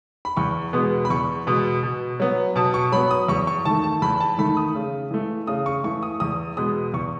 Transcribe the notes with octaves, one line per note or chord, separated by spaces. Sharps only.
B5
E2 C#6
B2 G#3 B3
B5
E2 C#6
B2 G#3 B3
B2
F#3 B3
B2 A5
C#6
F#3 B3 B5
D#6
E2 C#6
C#6
D#3 A3 A5
A5
E2 B5
A5
D#3 A3 B5
D#6
C#3
E3 A3
C#3 D#6
C#6
E3 A3 C#6
D#6
E2 D#6
B2 G#3 B3 D#6
E2 C#6